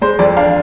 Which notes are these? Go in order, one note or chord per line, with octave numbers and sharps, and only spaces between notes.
G#3 C5
F2 D5
D4 F5